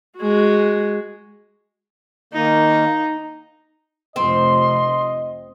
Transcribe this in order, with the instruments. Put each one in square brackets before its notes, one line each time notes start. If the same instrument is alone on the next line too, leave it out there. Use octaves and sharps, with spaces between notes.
[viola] G#3 F#4
[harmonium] D#3 A#3 [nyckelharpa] D#4
[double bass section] F1 F3 [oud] C4 [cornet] D#5 [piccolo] C6